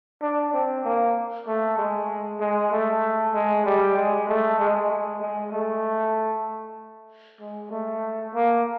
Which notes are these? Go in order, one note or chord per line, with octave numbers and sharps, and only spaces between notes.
D4
C4
A#3
A3
G#3
G#3
A3
G#3
G3
G#3
A3
G#3
G#3
G#3
A3
G#3
A3
A#3